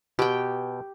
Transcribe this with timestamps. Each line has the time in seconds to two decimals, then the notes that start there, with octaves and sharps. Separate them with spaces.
0.19 B2 G4 G5